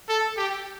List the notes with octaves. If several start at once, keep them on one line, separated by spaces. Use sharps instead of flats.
A4
G4